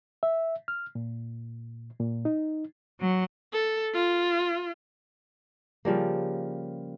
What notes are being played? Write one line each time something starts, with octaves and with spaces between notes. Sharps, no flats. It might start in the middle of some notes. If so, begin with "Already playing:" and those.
E5
F6
A#2
A#2
D#4
F#3
A4
F4
C#3 F3 G3 A#3